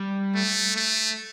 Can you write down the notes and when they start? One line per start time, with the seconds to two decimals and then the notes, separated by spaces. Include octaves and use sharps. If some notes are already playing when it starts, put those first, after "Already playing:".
Already playing: G3
0.35 A3
0.76 A3